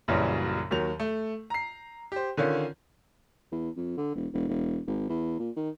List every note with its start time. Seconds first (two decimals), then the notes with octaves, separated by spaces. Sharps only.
0.08 A#1 F#2 C#3 E3 F#3 G3
0.71 D#2 D#3 F#3 F7
1.00 A3
1.50 A#5 C7
2.12 G4 C5
2.37 D3 D#3 C#4 F4
3.52 E2
3.77 F2
3.97 D3
4.15 E1
4.33 E1
4.49 E1
4.87 G#1
5.09 E2
5.39 A#2
5.57 D#3